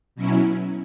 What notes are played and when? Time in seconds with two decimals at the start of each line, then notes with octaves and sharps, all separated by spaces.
0.16 B2 F#3 C#4 E4